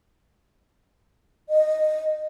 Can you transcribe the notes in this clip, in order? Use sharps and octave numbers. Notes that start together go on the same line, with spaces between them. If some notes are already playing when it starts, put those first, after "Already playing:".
D#5